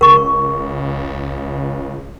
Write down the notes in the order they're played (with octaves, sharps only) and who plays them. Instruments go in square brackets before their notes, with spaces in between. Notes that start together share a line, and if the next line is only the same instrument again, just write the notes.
[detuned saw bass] C#2 [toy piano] A#4 C#6